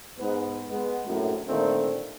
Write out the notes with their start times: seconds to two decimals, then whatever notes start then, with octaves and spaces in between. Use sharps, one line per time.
0.19 G#2 B3 B4
0.71 G#3 B3
1.07 A#1 F#2 A2
1.48 A#2 D3 D#3 A3 C4 D#4